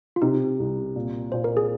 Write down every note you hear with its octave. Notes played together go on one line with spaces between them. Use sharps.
F4
C3 D#4
C2
A#2
A#2 C5
A#4
G#4